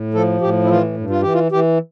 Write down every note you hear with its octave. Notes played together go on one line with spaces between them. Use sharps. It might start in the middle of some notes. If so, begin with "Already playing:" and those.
Already playing: A2
F3 A4
A2 G4
E4
E3 F4
G2
F4
E3 G4
F4
E3 G4